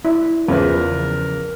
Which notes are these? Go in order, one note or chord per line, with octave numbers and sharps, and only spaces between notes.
E4 D5
E2 C#3 F3 A#4 B4